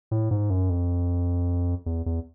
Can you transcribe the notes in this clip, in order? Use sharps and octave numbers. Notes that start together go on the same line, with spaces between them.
A2
G#2
F#2
F2
E2
E2